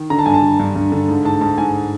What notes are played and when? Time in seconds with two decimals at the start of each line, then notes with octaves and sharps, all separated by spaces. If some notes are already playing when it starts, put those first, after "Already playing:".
Already playing: D#3
0.10 D3 A#5
0.19 A5
0.26 G2 G#5
0.34 A5
0.43 D3
0.60 G2
0.76 G2
0.92 D3
1.09 G#2
1.25 G#2 A5
1.41 G#2 A5
1.58 G#2 G#5